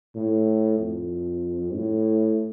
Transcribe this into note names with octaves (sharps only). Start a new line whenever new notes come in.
A2
F2
A2